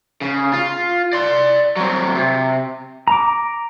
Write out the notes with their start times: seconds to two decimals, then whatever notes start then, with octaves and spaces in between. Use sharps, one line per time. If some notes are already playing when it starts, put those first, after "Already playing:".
0.21 C#3
0.53 F4
1.13 D5 C6
1.77 F#3 C4
2.15 C3
3.08 A#5 D6